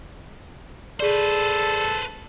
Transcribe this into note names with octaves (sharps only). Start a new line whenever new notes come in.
G#4 A4 B4 C5 D5